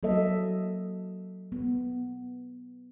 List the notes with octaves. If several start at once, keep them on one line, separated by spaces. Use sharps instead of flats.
F#3 A#3 A4 D#5 E5
B3